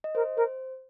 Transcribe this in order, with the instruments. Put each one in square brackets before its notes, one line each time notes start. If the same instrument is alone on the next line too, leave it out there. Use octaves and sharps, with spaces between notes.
[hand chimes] D#5
[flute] A#4 [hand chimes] C5
[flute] A#4 [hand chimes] C5